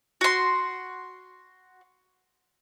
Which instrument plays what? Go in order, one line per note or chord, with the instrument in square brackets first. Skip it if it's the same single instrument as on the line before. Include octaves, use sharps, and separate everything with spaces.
[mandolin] F#4 C6